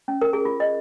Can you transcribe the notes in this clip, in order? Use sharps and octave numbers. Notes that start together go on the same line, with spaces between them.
C#4
A#4
G#4
F4
D#5